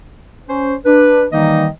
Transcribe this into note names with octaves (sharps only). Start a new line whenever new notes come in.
C#4 C5
D4 B4
D#3 E3 G3 A#3 D#4 D#5